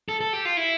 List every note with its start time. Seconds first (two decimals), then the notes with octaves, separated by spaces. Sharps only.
0.09 A4
0.21 A4
0.33 G4
0.45 F4
0.57 E4